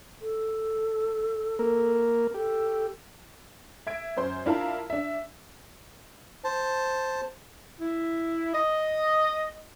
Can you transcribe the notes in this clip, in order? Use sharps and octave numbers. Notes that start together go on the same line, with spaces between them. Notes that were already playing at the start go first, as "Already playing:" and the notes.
A4
A#3 A#4
G4 A4
E5 G#6 D7
F#2 C5 C6
D4 E4 F4 A#4 F5 A5
D4 E5
C5 A5
E4
D#5